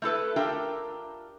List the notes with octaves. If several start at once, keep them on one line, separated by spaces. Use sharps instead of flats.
A3 E4 A4 B4
D4 F4 G4 A#4 E5